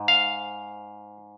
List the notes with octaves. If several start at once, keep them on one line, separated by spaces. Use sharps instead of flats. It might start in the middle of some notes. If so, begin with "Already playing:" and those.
Already playing: G#2
F5